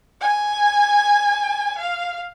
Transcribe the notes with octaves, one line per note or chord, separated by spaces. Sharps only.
G#5
F5